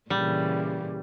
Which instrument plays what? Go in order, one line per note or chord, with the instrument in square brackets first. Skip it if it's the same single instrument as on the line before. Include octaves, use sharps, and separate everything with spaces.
[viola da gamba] A#2 C#3 E3 [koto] G3